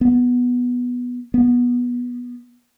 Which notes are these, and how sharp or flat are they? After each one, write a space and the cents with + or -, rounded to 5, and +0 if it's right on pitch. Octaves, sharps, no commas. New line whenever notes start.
B3 -5
B3 -15